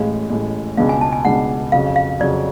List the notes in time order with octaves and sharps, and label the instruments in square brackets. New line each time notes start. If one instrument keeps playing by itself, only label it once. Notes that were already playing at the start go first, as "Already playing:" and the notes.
Already playing: [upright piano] A1 A2 G#3 [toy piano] F5
[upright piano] A1 A2 G#3
[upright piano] C#2 B2 G#3 D4 [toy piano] F5
[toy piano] G#5
A5
G#5
[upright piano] C#2 B2 G#3 D4 [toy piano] F#5
[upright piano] F2 C#3 F#3 [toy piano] F5
[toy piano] F5
[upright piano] F2 C#3 F#3 [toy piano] D5